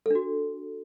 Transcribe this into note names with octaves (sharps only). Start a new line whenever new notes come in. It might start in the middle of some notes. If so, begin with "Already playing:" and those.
D4 F#4 A4